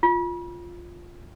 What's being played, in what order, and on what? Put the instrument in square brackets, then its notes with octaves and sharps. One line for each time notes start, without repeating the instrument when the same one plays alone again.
[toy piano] F4